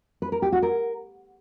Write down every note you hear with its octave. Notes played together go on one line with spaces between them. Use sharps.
B4
A#4
G4
F#4
A#4